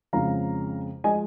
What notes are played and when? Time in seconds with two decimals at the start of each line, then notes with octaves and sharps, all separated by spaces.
0.13 F2 C#3 F3 G#3 F5 A#5
1.04 F3 G#3 D#5 G#5